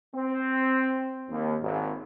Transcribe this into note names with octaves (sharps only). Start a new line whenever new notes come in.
C4
D#2
G#1